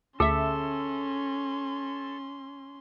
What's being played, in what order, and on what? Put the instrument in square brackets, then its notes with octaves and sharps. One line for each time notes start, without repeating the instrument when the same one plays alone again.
[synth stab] D2 E5 [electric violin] C#4 C6 [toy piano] G#4 [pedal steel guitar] A4